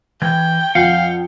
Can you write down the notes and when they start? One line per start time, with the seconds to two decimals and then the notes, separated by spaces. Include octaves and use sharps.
0.22 E3 G5 G#6
0.75 F2 F5 F#5